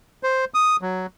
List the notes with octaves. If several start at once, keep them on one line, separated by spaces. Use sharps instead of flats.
C5
D#6
F#3